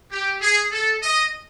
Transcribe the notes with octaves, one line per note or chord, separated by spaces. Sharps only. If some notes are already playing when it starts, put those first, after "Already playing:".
G4
G#4
A4
D#5